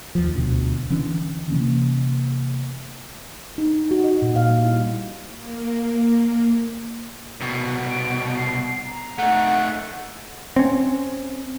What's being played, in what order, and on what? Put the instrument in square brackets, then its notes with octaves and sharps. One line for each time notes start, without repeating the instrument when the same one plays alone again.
[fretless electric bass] D#2 F3
D2 B2 D3
D3 E3 C#4 D4
C3 E3 A#3 C#4
[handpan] D#4
D#4
F#4
D#5
A#2
F5
G3
E4
[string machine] A#3
[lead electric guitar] C2 B2
[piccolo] D7
C7
A#5
[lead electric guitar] A3 D#4 [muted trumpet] F#5
[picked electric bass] C4 C#4